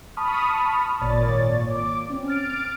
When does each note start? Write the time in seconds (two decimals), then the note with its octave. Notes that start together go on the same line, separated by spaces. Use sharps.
0.17 A5 B5 C#6 D#6 F6
1.01 G#1 A#2 C#5 D5 A6
1.70 D6
2.10 C4 C#4
2.28 F6 A6 D7